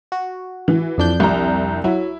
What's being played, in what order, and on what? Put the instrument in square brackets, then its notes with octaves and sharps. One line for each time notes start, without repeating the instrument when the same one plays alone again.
[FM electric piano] F#4
[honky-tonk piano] E3
[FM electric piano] F2 D4 G6
[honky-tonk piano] C2 A#5
[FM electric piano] F#3 [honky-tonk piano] E4